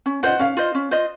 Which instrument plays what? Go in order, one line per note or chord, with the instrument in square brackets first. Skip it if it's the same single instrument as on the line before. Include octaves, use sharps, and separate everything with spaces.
[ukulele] C#4
[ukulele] F4 C5 D#5 [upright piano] F#5
[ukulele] C#4 [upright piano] F5
[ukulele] F4 C5 D#5
C#4
F4 C5 D#5